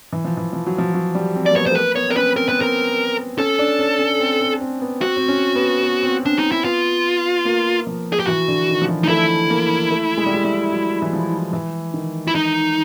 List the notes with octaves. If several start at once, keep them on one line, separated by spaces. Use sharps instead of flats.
E3
F3
E3
F3
F#3
F3
F#3
G3
C4
A#3 D5
B3 C#5
C5
A3
A#3 B4
B3 C#5
C4 A#4
C#4 B4
C4 A#4
B3 B4
C4 A#4
C#4 A4
D4
C#4
C#4
C4
C4
C4
B3
C4 F#4
C4
C#4
B3
B3
C4
C#4 D4
D#4
E4
B3 F4
A#3
F3
G#4
G4
E3 F#4
D3
D#3
F3
E3
D#4
A3 E4
A#3
A3
G#3
G3
G#3
G3
F#3
E3
F3
E3
D#3
E4
D#4